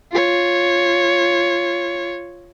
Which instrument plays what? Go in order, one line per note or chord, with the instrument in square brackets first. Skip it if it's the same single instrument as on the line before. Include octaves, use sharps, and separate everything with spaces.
[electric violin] F4 C#5